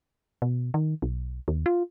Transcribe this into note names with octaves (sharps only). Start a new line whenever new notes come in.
B2
D#3
B1
D#2
F4